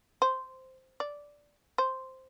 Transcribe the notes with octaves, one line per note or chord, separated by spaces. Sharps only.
C5
D5
C5